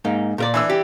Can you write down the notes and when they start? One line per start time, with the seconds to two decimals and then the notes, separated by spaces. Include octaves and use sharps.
0.05 G#2 A#3 D#4
0.38 A#2 A#4 D5
0.54 E3 D4 E6
0.70 G4